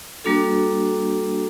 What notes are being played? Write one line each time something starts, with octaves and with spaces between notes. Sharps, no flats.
G3 A#3 D4 F#4 A4